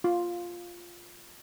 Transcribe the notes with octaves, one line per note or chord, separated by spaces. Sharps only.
F4